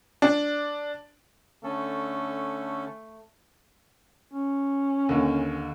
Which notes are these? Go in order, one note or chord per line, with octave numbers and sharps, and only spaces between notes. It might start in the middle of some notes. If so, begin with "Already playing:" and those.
D4
D3 A3 C#4 A4
C#4
D#2 D3